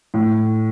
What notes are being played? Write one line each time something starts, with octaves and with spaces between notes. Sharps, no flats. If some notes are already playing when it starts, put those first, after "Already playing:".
A2